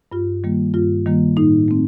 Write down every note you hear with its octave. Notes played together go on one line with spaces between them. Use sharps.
G2 F4
D#3 G3 A#3
G2 F4
D#3 G3 A#3
A2 D#4
A3 C4